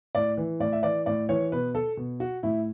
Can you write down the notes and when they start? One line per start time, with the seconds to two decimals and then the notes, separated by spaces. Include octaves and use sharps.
0.15 A2 D5
0.37 E3
0.60 A2 D5
0.72 E5
0.83 E3 D5
1.06 A2 D5
1.29 E3 C#5
1.52 B2 B4
1.75 A4
1.97 B2
2.20 F#4
2.43 A2 E4